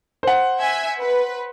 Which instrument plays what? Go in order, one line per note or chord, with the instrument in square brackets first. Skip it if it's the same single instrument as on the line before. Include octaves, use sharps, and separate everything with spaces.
[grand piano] C5 F#5
[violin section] E5 G#5 G#6
B4